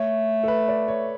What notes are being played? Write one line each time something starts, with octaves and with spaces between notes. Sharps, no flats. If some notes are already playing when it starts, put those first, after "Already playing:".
Already playing: A3 C#5
A4
B4
D5
C#5